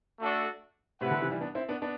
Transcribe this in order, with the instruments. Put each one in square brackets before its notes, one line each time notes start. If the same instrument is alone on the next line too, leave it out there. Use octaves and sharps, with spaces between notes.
[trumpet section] A3 D4 F#4 A4 D5
[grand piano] A2 C3 [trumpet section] E4 B4 F#5
[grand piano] B2 D3
C3 E3
E3 G3
B3 D4
C4 E4
B3 D4
B3 D4